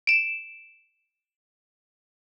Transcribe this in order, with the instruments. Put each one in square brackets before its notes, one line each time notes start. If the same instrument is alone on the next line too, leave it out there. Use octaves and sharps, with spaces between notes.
[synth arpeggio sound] D7 E7